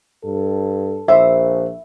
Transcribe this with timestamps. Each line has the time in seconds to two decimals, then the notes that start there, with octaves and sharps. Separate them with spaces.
0.24 G2 A4
1.08 A#1 C5 E5